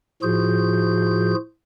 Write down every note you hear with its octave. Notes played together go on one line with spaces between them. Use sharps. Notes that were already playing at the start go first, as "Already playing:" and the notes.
A2 F3 F4 F#4 G#4 G6